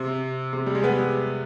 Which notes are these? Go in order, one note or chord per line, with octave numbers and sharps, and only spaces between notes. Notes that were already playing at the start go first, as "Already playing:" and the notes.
Already playing: C3
C3
G3
G#3
G3 B3